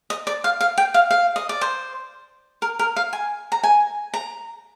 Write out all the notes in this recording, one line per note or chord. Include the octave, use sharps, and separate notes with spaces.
D#5
D5
F5
F5
G5
F5
F5
D#5
D5
C5
A#4
A#4
F5
G#5
A#5
G#5
A#5